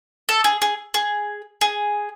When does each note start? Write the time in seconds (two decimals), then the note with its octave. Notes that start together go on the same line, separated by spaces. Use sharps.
0.29 A4
0.44 G#4
0.62 G#4
0.94 G#4
1.61 G#4